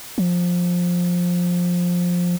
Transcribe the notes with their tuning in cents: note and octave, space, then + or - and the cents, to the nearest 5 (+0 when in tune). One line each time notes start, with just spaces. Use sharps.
F3 +15